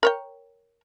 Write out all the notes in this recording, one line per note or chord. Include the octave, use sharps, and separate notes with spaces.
A#4 C#5 G5